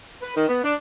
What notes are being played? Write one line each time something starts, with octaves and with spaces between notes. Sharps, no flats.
B4
D#3
B3
D4